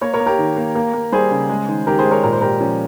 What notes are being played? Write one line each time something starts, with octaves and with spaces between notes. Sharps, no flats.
A#3 A#4 C#5
A#4 C#5
A#3
G4 A#4
D#3
A#3
A#3
A#3
G3 G#4 C5
C#3
G#3
D#3
D#3 G4 A#4
G#4 C5
G#3
A#4 C#5
A#2 A#4
C5
A#2 G4 A#4
F3 C#4